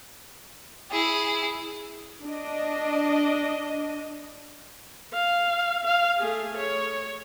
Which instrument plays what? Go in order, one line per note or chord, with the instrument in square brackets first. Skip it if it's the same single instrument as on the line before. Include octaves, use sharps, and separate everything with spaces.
[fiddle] E4 G#4
[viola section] D4 D#5
[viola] F5
F5
A3 G#4
C#5